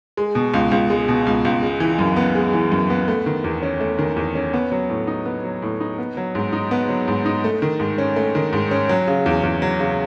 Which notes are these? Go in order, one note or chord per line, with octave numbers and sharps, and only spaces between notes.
G#3
B2
C#2
C#2
G#3
B2
C#2
C#2
G#3
E3
F#2
B3
G#3
E3
F#2
B3
A3
D#3
E2
C#4
A3
D#3
E2
C#4
B3
F#3
A2
D#4
B3
F#3
A2
D#4
B3
F#3
G#2
D#4
B3
F#3
G#2
D#4
A3
D#3
G#2
C#4
A3
D#3
G#2
C#4
F#3
C#3
E2
E2
F#3
C#3